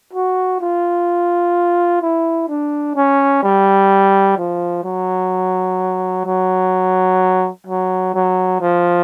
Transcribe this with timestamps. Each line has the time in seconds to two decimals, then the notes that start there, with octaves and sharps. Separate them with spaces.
0.13 F#4
0.61 F4
2.02 E4
2.49 D4
2.96 C#4
3.43 G3
4.37 F3
4.84 F#3
6.25 F#3
7.67 F#3
8.14 F#3
8.61 F3